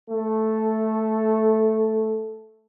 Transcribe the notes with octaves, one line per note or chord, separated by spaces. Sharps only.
A3 A4